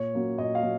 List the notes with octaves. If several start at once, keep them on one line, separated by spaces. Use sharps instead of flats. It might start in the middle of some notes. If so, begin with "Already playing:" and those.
Already playing: A#2 C#5
F#3 A#3 C#4
A#2 D#5
F5
F#3